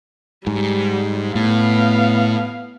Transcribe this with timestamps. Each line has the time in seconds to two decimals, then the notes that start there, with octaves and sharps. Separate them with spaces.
0.47 G#2 G3
1.35 A2 B3 F5